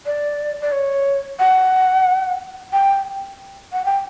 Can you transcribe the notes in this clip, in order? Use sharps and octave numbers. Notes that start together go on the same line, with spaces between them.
D5
D5
C#5
F#5
G5
F#5
G5